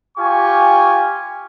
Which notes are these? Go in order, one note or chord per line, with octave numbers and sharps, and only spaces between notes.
F4 G4 G#5 C#6